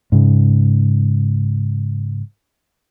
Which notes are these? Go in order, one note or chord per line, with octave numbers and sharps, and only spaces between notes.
G#2 C#3